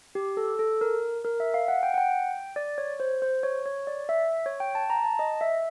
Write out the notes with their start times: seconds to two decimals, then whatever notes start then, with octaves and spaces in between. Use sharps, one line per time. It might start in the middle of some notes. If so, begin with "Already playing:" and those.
0.15 G4
0.37 A4
0.59 A4
0.81 A#4
1.25 A#4
1.40 E5
1.54 F5
1.68 F#5
1.83 G5
1.94 F#5
1.98 G5
2.56 D5
2.78 C#5
3.00 C5
3.22 C5
3.43 C#5
3.66 C#5
3.87 D5
4.09 E5
4.46 C#5
4.60 G5
4.75 A5
4.90 A#5
5.04 A5
5.19 D#5
5.41 E5